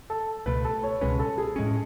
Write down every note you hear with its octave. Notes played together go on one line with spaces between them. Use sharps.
A4
C#2 B2 A3 B4
A4
C#5
C#2 B2 G#3 C#4 B4
A4
G#4
A2 G#3 C#4